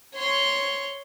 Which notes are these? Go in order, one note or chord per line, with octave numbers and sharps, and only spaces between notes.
C#5 C6